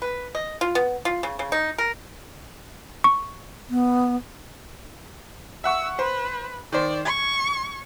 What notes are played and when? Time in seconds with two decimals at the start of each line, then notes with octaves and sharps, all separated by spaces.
0.02 B4
0.35 D#5
0.61 F4
0.75 B3
1.05 F4
1.23 C#3
1.39 C#3
1.52 D#4
1.78 A#4
3.04 C#6
3.70 B3
5.64 E5 F#5 C#6 E6
5.99 B4 C5
6.72 D#3 C5 D5
7.05 C#6 G#6